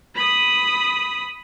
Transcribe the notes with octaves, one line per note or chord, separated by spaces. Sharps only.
B5 D#6